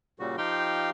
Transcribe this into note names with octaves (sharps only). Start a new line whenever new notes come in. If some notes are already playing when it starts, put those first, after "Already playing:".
A#2 C#3 G3 F#4
F3 D#4 G4 F5 G5 C6